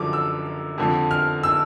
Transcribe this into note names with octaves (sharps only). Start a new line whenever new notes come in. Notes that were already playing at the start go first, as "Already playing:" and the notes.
Already playing: F#2 D3 F3 D6
E6
F2 D3 F3
F6
E6